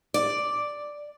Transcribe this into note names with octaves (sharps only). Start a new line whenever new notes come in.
D5